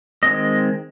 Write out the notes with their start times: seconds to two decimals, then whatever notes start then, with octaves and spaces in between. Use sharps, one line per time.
0.23 D#3 G#3 C4 D#5